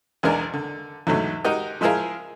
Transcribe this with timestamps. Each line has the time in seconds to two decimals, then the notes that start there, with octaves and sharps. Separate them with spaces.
0.23 B1 E2 G#3 D4 A#4 G#5
0.53 D3
1.07 E2 G#2 D3 F#3 A3
1.45 G#3 D#4 F#4 G4 A#4 D#5
1.81 F3 G#3 E4 G#4 A#4 F5